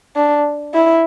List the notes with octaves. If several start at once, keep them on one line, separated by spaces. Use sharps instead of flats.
D4
E4